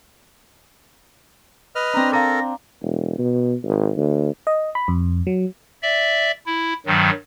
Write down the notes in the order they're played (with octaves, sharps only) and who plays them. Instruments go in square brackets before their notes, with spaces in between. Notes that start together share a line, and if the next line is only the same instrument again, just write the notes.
[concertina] B4 D#5 F6
[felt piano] C4 D4 [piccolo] A#5
[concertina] A4 A#4 [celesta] F5 A#5 D6 [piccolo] A#6
[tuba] E1
B2
G#1
D2
[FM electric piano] D#5
B5
F2
F#3
[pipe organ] D5 E5
E4
G2 D#3 F#3